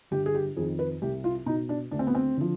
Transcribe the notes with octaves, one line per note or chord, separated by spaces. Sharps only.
G1 G4
G#4
G4
F2 D#3 G#4
B4
C2 G4
F4
B2 D#4
D4
D2 D4
C4
B3
C4
D3 F3